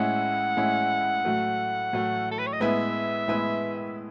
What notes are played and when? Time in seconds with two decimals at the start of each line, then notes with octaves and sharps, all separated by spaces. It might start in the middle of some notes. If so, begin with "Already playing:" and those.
Already playing: A2 G#3 C#4 E4 F#5
0.57 A2 G#3 C#4 E4
1.25 A2 F#3 A3
1.93 A2 F#3 A3
2.31 A4
2.39 B4
2.46 C#5
2.53 D#5
2.60 A2 G#3 B3 E4 B4 E5
3.28 A2 G#3 B3 E4 B4